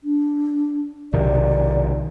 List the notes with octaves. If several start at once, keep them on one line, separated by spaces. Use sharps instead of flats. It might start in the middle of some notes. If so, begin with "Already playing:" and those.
D4
B1 C3 D#3 D5